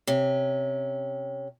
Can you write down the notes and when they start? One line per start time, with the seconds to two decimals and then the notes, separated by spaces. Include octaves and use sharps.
0.07 C3 C#4